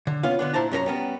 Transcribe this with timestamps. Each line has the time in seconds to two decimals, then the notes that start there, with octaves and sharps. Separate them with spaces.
0.07 D3
0.23 B3 C#4 F4 F5
0.39 D3 B3 D4
0.54 A#2 E4 C5 A5 A#5
0.71 F#2 C#4 A#4 A#5
0.86 G3 B3 C#4